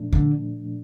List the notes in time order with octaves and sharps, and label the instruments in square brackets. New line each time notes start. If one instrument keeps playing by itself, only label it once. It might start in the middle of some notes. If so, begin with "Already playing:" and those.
Already playing: [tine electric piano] A#2 F3 A3 D4
[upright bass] D3